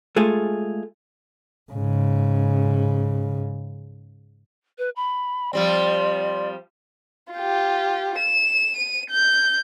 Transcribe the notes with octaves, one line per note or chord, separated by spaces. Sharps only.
G#3 A3 F4 G#4
G#2 C#3
B4
B5
F3 G3 C4 D5
F4 G4
E7
D#7
G6